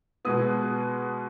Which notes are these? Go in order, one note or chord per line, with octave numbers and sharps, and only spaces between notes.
B2 G#3 B3 D#6